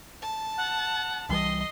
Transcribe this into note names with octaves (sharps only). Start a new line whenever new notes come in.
A5
F#5
C2 E3 G3 D#5 C6